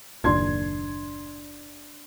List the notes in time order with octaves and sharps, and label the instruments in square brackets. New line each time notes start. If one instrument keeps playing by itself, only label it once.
[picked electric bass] F#1 D#2 A#2 [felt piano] D4 C6 G#6